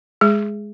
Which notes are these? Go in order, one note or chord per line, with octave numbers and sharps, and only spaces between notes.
G#3 G#4